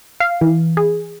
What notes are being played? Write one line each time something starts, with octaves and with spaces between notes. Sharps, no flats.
F5
E3
G#4